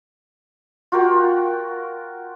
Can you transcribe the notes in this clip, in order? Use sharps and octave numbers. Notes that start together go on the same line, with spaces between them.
F4 F#4 A#4 G5